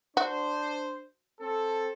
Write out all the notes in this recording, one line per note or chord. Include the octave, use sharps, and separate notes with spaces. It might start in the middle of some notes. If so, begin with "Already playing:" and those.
D4 F#4 C5
C4 A4